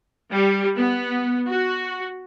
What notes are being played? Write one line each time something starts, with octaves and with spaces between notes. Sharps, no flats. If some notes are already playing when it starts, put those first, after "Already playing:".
G3
B3
F#4